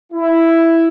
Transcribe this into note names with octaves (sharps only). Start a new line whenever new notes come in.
E4